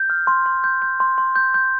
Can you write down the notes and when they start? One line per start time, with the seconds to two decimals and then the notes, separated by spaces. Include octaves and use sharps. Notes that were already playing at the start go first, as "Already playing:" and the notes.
Already playing: G6
0.10 F6
0.27 C6
0.46 C6
0.64 G6
0.82 G6
1.00 C6
1.18 C6
1.36 G6
1.54 G6